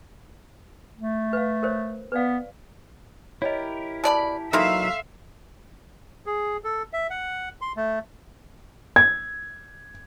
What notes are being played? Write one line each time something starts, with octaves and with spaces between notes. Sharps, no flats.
A3
B4 F5
A#4 C5 C#5
B3 B4 D5 F5
E4 G4 A#4 C#5 D#5
B2 D5 G#5 A5 B5
E3 F#3 A#3 D#4 A4 E5 F5 C6
G#4
A4
E5
F#5
C6
A3
G#6